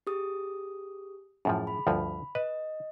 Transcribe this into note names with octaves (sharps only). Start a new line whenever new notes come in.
G4 G#4 D#6
F#2 A2 F3 G#4
B5
D2 G2 F3
B4 D#5